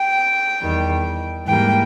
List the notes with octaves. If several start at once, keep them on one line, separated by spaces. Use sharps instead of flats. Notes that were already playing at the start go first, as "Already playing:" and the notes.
Already playing: G5
E2 D#3 G3
G#2 E3 G3 A#3 G5